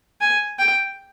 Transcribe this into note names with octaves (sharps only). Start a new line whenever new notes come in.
G#5
G5